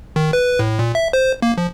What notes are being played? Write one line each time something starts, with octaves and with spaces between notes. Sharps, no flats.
D#3
B4
A2
A#2
E5
C5
A#3
F3